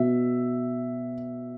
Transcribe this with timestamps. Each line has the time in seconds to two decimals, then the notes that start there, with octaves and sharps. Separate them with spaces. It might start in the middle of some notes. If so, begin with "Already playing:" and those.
Already playing: B2 E5